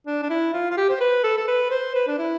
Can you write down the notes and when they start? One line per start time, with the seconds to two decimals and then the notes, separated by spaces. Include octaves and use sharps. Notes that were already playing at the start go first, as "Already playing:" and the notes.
0.07 D4
0.23 D4
0.30 E4
0.54 F4
0.71 F4
0.77 G4
0.89 C5
1.01 B4
1.24 A4
1.37 A4
1.48 B4
1.71 C5
1.95 B4
2.08 D4
2.18 E4